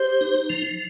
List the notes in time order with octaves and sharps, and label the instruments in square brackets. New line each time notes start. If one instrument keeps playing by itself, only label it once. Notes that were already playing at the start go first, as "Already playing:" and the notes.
Already playing: [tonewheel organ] G4 [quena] C5
[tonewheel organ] D#4
F3